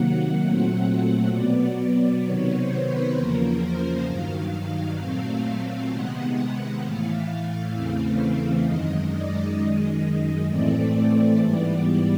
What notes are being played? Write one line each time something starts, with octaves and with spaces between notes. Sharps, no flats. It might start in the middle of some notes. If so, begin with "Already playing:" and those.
Already playing: C3 D#3 F#3 A#3 F#5
A#2 F#3 A3 C4
B2 F#3 B3 D5
D5
C3 D#3 F#3 B3 C#5
C5
B4
E2 C#3 F3 A#3 A#4
C5
G2 D#3 F#3 F5
A#2 F#3 A3 C4
C3 D#3 G#3 B3 F#5
A2 E3 A3 F5
E2 C#3 E3 A3 C4
F#2 D#3 G#3 D#5
D5
F#2 D#3 G#3 D#5
A2 E3 A3 C4 D5
G#2 E3 G3 B3